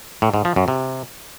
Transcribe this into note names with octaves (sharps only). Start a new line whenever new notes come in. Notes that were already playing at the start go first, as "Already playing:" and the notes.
A2
G#2
F3
F#2
C3